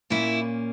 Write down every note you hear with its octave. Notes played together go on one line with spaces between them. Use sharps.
A#2 A#3 C#4 E4